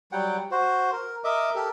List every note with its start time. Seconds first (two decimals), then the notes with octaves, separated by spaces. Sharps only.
0.12 F#3 G3 F#5 G5
0.51 F#4 C5
0.92 A#4
1.24 A#4 D#5 E5 D6
1.55 G4 A4 A#4